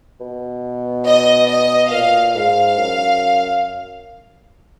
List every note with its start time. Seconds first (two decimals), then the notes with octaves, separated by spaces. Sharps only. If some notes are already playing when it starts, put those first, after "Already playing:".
0.20 B2
1.07 D#5
1.49 D#5
1.91 A#2 F5
2.35 G#2 F5
2.78 F#2